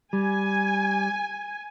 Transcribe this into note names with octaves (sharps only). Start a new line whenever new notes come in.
G3 G#5